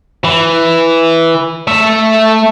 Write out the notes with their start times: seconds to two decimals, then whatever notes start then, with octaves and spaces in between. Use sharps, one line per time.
0.24 E3
1.67 A3 E5